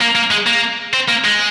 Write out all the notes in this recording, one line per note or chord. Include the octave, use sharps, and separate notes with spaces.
A#3
A#3
G#3
A#3
C4
A#3
G#3